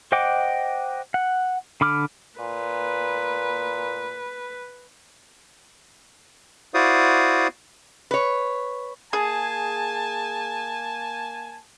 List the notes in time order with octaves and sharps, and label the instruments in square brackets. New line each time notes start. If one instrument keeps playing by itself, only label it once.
[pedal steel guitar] C5 D#5 F#5 G5 D6
F#5
D3 B5 D6 F6
[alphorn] A#2 [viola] B4
[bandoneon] E4 F#4 C5 D5 F5 D#6
[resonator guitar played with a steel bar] B4 C#5
[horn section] A#3 G#5 A5 [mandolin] G#4